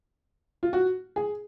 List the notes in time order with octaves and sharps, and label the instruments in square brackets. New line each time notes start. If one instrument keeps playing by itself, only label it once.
[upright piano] F4
F#4
G#4